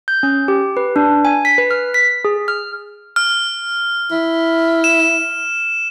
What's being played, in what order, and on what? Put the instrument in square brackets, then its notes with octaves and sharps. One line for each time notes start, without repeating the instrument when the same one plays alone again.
[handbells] G6
C#4
G4
B4
D4
G#5
B6
B4
F6
B6
G#4
F6
[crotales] F6
[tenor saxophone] E4
[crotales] E7